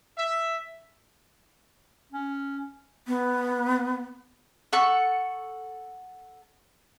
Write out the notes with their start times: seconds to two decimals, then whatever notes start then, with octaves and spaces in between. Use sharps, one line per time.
0.16 E5
2.13 C#4
3.07 B3
4.73 A4 F#5 C#6